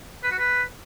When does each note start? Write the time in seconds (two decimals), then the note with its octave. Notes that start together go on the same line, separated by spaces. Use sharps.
0.23 B4
0.31 F#4
0.38 B4